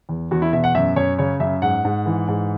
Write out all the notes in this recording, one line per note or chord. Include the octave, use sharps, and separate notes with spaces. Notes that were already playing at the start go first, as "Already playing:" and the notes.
E2
E2 F#4
E4
B2 E5
F#5
F#2 E5
F#2 C#5
C#3 C#5
F#2 E5
G#2 F#5
G#2
E3
G#2